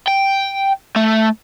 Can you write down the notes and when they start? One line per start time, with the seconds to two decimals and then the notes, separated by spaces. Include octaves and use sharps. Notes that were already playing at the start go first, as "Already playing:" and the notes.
0.07 G5
0.96 A3